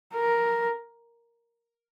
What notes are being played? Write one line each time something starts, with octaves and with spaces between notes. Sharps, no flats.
A#4